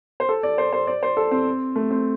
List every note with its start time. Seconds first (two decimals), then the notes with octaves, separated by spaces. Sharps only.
0.20 C5
0.29 A4
0.43 D5
0.58 C5
0.73 C5
0.87 D5
1.03 C5
1.17 A4
1.31 C4
1.76 A3
1.91 C4